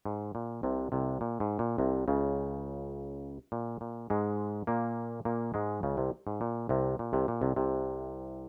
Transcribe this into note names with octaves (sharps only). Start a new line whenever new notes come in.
G#2
A#2
C2 C3
C2 C3
A#2
G#2
A#2
C2 C3
C#2 C#3
A#2
A#2
G#2 G#3
A#2 A#3
A#2 A#3
G#2 G#3
C#2 C#3
C2 C3
G#2
A#2
C2 C3
A#2
C2 C3
A#2
C2 C3
C2 C3